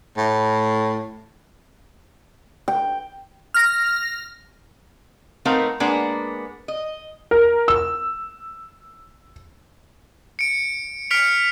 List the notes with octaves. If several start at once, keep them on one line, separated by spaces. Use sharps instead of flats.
A2
G5
F6 A#6
A3 B3 C4 D#4 A#4 F5
G#3 A#3 B3 D4
D#5
A#4
E6
C#7 D7
F6 B6 C#7 D7 F7